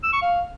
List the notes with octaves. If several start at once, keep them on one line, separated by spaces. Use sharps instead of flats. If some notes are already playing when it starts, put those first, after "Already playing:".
E6
C#6
F5